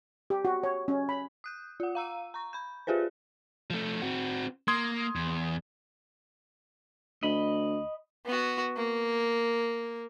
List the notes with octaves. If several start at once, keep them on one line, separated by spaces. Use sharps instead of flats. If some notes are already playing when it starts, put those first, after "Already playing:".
G4
F#4
C#5
C#4
B5
D#6 F#6 G6
F4 F#5
F5 A#5 E6 D#7
A#5 C#6
B5 G6
F4 G4 G#4 B4 C5
F3 A3
C4 F#4
A#3 C6 D#6 G#6
E2
D2 D#5 B5
B3 F#4
A#3